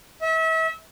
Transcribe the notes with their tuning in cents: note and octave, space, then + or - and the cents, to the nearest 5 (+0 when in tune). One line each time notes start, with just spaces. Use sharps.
E5 -35